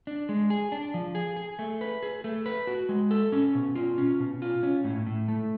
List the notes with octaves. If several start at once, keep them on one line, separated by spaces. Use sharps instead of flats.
D4
G#3
G#4
D4
F3
G#4
G#4
A3
B4
G#4
A3
B4
F#4
G#3
A4
C#4
B2
F4
C#4
B2
F4
C#4
A2
A2
A3